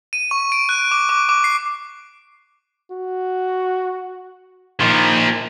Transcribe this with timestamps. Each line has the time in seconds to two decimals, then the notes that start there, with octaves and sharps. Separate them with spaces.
0.13 D#7
0.31 C#6
0.52 D7
0.69 F#6
0.91 D6
1.09 D6
1.29 D6
1.44 C7
2.91 F#4
4.80 A#2 D#3 F3